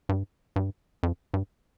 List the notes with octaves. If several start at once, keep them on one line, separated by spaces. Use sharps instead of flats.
G2
G2
F2
G2